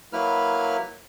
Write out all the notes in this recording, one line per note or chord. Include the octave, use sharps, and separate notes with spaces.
F#3 A#3 E4 B4 F6